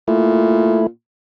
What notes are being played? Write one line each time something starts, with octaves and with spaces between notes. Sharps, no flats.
A#2 A3 E4